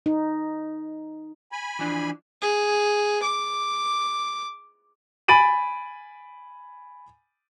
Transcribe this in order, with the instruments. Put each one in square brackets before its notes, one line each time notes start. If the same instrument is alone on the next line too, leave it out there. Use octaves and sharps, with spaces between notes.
[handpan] D#4
[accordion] G#5 B5
[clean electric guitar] E3 F3 D4
[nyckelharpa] G#4
D6
[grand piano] G#5 B5 A6 D7 D#7 F#7